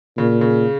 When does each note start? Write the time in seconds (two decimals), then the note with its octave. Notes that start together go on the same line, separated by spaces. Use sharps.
0.18 A#2 C#3
0.41 C#3